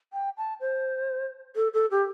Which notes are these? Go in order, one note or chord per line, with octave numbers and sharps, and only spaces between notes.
G5
A5
C5
A4
A4
G4